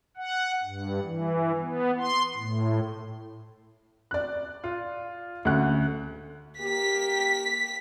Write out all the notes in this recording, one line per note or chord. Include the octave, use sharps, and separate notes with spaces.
F#5
G2
E3
B3
C6
A2
D5 F#6
F4
D2 C#4 F#5 F#6
A#3 G4 B6